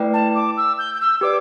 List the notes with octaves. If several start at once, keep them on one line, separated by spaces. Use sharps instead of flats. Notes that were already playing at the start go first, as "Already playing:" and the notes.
Already playing: A3 E4 B4 D5 G5
A5
D6
E6
G6
G6
E6
G4 B4 D5 D6